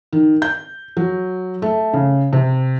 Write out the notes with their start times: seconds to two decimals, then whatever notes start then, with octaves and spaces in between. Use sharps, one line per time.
0.13 D#3
0.42 G6
0.97 F#3
1.62 A3
1.93 C#3
2.33 C3